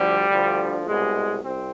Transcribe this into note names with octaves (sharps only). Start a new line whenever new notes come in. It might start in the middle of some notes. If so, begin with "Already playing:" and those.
Already playing: D2 D3 F3 G3
D2 D3 F3
C2 B2 G#3
C2 C4